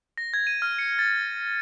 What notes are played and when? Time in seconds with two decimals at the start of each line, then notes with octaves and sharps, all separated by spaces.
0.18 A#6
0.34 G#6
0.47 D#7
0.62 F6
0.79 C#7
0.99 A6